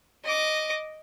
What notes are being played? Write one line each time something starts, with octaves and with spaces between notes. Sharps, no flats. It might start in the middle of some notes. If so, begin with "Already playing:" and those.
D#5 D6